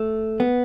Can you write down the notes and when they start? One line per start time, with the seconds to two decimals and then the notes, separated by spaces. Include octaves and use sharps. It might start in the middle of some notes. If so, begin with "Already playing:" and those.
Already playing: A3
0.40 B3